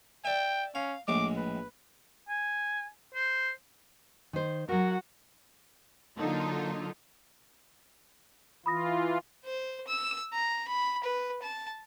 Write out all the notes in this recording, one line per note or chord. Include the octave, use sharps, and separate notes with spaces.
D5 E5 G5
C#4 F5
A#1 A2 G#3 D6
B4
G#5
C5
D#3 C5
F#3 F#4 A#4 F#5
D3 F#3 A#3 D#4 F4 A4
E3 F4 B5 D#6 A#6
C5
E6
A#5
B5
B4
A5